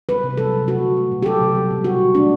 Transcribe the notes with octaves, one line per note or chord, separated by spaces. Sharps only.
G3 B4
C3
F#3 A4
C3
A3 F#4
D3
A3
B2
G4
F#3 A4
C3
G3
B2
G3 F#4
D3
A3 D4